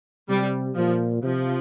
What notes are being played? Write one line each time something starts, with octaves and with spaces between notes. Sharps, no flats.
C3 G3
A#2 F3
C3 F3